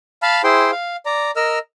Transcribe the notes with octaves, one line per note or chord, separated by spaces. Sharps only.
F5 A5 B5 F6
E4 G#4 C5 G5 C6
F5
D5 A#5
A#4 D#5 E6 F6